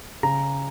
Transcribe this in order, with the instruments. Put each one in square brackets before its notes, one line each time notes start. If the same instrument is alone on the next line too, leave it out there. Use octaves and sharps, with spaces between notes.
[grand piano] C#3 A#5